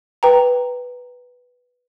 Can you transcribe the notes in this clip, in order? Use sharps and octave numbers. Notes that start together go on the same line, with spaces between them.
B4 G5 A#5